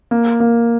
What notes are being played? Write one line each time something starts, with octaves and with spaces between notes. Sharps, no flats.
A#3
A#3